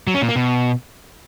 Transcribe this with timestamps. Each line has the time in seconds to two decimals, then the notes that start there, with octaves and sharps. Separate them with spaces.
0.07 F#3
0.14 C#4
0.22 A#2
0.29 A#3
0.36 B2